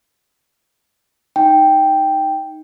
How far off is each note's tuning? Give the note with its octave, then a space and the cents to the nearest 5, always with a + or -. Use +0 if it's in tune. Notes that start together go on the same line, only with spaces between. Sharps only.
D#4 +0 G5 +0